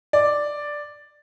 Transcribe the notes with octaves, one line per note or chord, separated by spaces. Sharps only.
D5